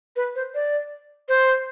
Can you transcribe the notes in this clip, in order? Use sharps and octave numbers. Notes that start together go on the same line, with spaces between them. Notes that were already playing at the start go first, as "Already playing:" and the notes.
B4
C5
D5
C5